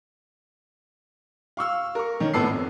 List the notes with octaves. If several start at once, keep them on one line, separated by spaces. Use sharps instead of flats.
F5 C#6 E6 F6
A#4 C#6
D#3 C#4
G#1 A2 B3 A5 E6 C7
F2